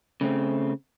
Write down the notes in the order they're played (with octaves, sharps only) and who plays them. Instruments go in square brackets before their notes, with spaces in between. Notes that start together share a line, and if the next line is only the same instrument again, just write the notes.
[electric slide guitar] C#3 A3 C4